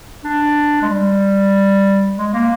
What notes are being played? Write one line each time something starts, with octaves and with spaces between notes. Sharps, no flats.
D4
G#3
G3
G#3
A#3